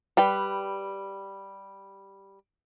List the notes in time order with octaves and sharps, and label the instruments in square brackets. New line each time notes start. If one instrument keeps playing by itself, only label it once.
[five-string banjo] G3 B4 G5